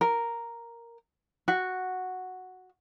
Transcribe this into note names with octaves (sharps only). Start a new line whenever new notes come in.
A#4
F#4